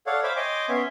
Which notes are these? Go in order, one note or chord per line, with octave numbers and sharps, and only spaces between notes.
A4 C#5 D5 F5 F#5
C5 C#5 E5 F5 B5 D6
C#5 D#5 G5 G#5 C6 D6
B3 C#4 C#5 E5 C6